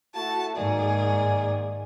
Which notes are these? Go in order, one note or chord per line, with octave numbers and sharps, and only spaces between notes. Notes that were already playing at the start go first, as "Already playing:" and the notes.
A3 E4 F#4 A5
G#2 D#3 A#3 G#4 D5